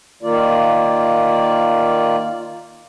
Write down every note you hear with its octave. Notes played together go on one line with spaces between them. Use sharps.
D#3 A#3 F4 D5